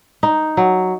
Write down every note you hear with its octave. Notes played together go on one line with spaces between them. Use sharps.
D#4
F#3